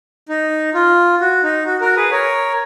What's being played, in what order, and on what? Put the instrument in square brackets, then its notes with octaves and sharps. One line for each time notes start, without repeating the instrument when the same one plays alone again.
[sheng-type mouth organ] D#4
F4
F#4
D#4
F#4
F#4 A#4
G#4 B4
A#4 C#5